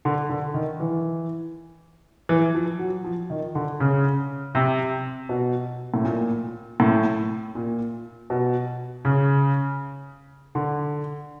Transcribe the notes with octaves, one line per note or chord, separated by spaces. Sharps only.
D3
D3
D#3
E3
E3
F3
F#3
F3
D#3
D3
C#3
C3
B2
A2
A#2
A2
A#2
B2
C#3
D3